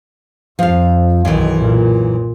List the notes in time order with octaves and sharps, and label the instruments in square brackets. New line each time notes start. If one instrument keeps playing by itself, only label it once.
[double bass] F2 [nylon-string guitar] F3 F5
[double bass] B1 D#3 [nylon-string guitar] F#2 E3
[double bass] A#2